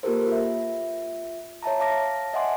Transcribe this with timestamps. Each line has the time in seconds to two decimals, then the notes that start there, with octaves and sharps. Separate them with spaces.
0.03 A#3 F4 G4 A4 A#4 C5
0.27 F4 E5
1.63 C#5 E5 A5 A#5
1.80 F5 A5 D6 A#6
2.34 D#5 E5 F#5 G#5 C6 D6